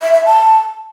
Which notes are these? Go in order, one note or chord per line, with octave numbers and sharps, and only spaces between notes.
E5
E5
A5